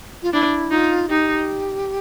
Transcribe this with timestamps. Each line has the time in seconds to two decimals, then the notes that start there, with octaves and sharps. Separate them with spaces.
0.23 F4
0.33 D4 E4
0.71 D#4 F4
1.09 D#4 G4